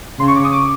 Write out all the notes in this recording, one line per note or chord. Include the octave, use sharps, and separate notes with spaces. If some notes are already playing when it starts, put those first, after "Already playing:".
C#3 C6
C#6
D6
D#6
D6